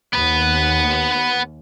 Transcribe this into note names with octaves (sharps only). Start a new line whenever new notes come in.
D#2 B3 B4